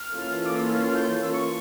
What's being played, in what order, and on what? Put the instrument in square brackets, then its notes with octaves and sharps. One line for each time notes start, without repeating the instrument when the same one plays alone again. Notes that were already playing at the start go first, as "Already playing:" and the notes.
Already playing: [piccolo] F6
[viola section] E3 A#3 C#4 F4 A4
[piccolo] D6
E6
F6
F6
G6
E6
C#6